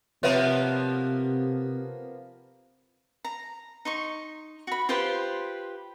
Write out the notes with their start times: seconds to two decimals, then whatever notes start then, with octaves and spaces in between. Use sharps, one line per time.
0.23 C3 F3 A#3 B3 C#5 E5
3.25 A#5
3.85 D#4 C6 C#6
4.67 F#4 B5
4.89 F4 G4 B4 C5